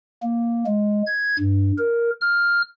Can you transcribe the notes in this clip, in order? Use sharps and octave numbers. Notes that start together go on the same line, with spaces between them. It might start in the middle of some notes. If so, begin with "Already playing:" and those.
A#3
G#3
G#6
G2
A#4
F6